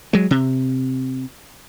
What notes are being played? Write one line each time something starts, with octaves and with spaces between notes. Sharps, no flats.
F#3 G#3
C3